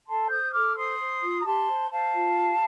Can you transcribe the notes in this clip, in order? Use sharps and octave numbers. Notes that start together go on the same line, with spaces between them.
A4 A5 C6
C5 D#6 G6
A4 D6 F6
C5 C6 D#6
C5
F4
A#5
G4 A5 C6
C5
C5 F5 A5
F4
G4